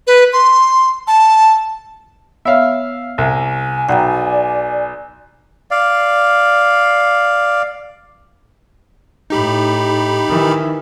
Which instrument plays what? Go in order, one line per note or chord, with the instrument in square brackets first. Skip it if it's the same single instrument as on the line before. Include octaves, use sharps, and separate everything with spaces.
[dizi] B4
C6
A5
[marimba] B3 C#5 [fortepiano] E5 F5
[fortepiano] C2 [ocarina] G#5
[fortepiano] B1 [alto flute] D5 [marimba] F#5 G5 A#5
[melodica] D5 F5
[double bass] A2 [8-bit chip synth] D#4 G4 B5
[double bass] D#3 E3